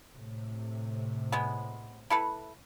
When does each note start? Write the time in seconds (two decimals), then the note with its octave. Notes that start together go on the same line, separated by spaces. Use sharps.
0.12 A2 C3
1.32 G#3 B3
2.10 E4 A4 B4